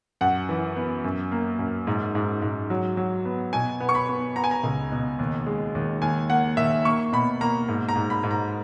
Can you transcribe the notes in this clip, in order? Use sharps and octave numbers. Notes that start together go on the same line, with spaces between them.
F#2 F#5
E3
B3
F#2
A#3
F#2
G#2
G#2
G#2
F#3
F#3
B3
B2 G#5
B3
C#6
B5
B3
B3 A#5
G#5
A#5
C#2
B2
D#2
G#3
D#2
D#2 G#5
A#3 F#5
D#2 E5
A#3 C#6
B2 B5
A#3 A#5
G#2
A#5
G#2
B5
G#2
A#5